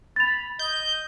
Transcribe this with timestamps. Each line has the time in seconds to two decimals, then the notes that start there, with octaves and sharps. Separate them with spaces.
0.16 B5 A6 F7
0.59 D#5 G6